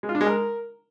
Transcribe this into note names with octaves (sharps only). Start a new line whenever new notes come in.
G#3
F4
D4
G#3
A#4